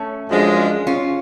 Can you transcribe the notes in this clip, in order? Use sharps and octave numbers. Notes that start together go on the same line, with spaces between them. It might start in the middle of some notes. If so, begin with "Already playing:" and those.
Already playing: A3 C#4
F#2 F3 G#3 D4
C#4 F4